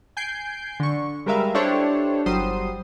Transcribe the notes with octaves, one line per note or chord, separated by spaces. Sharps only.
G#5 G6 C7 D7
D3 C#6
G3 G#3 A#4 B4 E5 F5
D4 E4 G4 A4 C5 C#5
G1 F#3 G3 C5 C6 D#6